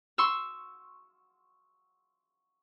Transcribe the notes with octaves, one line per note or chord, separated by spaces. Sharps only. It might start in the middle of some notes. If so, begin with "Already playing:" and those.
C6 C#6 E6